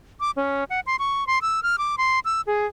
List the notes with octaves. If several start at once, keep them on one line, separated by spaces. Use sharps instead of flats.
D6
C#4
F#5
C6
C#6
C6
E6
F6
D6
C6
E6
G#4